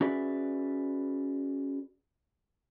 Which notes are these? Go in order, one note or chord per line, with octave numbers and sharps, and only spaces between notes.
C#4 F#4 G#4 B4 D5 E5